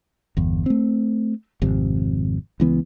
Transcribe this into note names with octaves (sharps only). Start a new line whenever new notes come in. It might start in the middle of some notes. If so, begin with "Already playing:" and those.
G1 E2
A3 C4
G#1 F2 C3
C#2 E3 B3